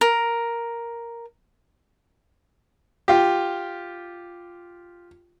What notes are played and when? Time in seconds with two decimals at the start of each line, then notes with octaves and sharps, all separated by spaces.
0.01 A#4
3.08 F4 G4